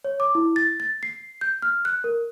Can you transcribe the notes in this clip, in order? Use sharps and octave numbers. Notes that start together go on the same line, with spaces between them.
C#5
D6
E4
A6
A6
C7
G6
F6
F#6
A#4